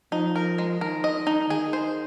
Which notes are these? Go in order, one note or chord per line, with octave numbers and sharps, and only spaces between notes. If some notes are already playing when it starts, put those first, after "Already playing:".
F3 D#4
A#4
G#3
D#3 A#4
D#5
D#4
D#3 G#4
C5